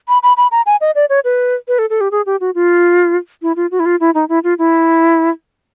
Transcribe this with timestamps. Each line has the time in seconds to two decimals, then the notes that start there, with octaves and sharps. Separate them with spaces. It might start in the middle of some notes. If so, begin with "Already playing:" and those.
0.08 B5
0.23 B5
0.37 B5
0.52 A#5
0.66 G#5
0.81 D#5
0.95 D5
1.10 C#5
1.25 B4
1.68 B4
1.79 A4
1.90 A4
2.01 G4
2.11 G#4
2.26 G4
2.40 F#4
2.55 F4
3.42 E4
3.56 F4
3.71 F#4
3.80 E4
3.86 F4
4.00 E4
4.14 D#4
4.29 E4
4.44 F4
4.59 E4